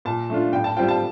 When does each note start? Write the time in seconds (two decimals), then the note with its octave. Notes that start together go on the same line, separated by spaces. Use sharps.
0.05 A#2 A5
0.30 A3 D4 F4
0.53 A2 G5
0.64 A5
0.76 G3 C4 F4 G5
0.88 A5